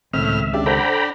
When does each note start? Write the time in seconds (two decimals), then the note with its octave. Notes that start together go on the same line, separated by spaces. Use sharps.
0.13 C#2 A2 D#3 C4 E5 F6
0.53 C#3 D4 G4 E5
0.66 A4 C5 F#5 G5 A#5 B5